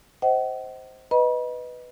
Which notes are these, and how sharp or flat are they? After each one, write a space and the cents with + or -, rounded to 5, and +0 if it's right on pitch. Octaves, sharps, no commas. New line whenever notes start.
C5 +0 D#5 +25 F#5 +40
B4 +5 D#5 +0 B5 -40